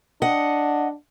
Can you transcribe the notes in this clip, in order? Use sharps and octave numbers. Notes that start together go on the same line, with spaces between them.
D4 D#5 F#5